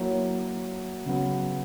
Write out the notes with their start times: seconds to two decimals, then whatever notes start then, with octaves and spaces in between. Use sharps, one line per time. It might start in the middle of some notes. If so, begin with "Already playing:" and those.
Already playing: F#3 A#3 E4 A#4 C#5
1.06 C#3 F#3 B3